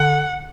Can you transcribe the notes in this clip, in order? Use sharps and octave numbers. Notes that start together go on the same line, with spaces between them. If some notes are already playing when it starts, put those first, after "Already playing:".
Already playing: D3 F#5